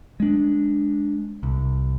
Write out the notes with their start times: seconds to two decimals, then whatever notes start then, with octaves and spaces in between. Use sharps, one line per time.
0.20 G#3 D4
1.43 C2